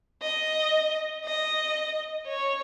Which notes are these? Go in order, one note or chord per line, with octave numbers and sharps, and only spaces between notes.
D#5
D#5
C#5